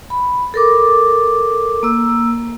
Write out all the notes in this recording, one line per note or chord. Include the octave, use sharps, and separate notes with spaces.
B5
A4 A#4 D6
A#3 E6